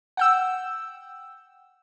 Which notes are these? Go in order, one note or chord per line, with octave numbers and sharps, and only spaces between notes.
F#5 G5 E6